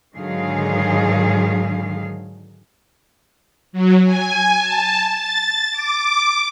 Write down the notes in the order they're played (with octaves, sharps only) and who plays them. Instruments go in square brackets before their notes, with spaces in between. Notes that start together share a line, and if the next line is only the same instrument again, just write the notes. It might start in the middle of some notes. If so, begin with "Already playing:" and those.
[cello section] G#2 D3 D#3 F#3 G#4 F5
[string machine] F#3
G#5
A5
A6
D6